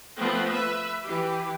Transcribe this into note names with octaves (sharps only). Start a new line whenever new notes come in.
F3 A3 B3 C4
B4 E5
E3 G4